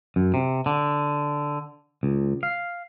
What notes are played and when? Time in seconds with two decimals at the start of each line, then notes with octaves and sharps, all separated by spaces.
0.16 F#2
0.34 C3
0.66 D3
2.03 C#2
2.43 F5